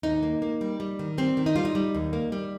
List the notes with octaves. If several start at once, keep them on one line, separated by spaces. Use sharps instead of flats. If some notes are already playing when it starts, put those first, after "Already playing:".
D#2 D#4
A#3
A#3
G3
G3
D#3
G3 C4
D#3
D#4
G3 F4
D#4
G3
D#2
A#3
G3